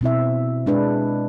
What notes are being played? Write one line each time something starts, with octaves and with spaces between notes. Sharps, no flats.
B2 C4 E4 E5
G#3 D4 B4